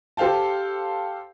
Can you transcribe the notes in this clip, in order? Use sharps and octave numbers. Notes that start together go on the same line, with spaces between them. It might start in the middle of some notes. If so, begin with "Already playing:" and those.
G4 A4 C5 F5 G5 A5